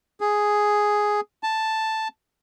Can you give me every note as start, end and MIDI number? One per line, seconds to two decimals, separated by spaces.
0.21 1.20 68
1.43 2.08 81